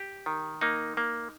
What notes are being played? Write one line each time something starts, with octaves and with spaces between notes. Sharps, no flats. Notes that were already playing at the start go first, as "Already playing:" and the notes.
Already playing: G4
D#3
A#3 D#4
A#3